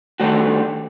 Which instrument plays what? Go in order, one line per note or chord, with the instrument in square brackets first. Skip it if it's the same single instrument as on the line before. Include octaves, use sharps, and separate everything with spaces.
[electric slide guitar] D3 D#3 G3 A3 F#4